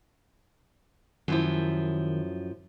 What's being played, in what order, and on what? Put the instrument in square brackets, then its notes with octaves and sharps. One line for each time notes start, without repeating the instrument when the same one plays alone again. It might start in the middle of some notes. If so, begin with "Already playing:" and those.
[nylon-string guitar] F#2 F3 E4 [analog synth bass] D#3